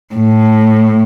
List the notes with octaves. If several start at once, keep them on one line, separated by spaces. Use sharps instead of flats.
A2